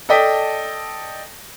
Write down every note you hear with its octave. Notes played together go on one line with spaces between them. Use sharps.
A4 D5 D#5 G5 A5 B6